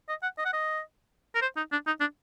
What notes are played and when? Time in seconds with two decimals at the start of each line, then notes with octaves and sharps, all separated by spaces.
0.09 D#5
0.23 F#5
0.38 D#5
0.45 F#5
0.53 D#5
1.35 A#4
1.42 C5
1.57 D#4
1.72 D4
1.87 D#4
2.00 D4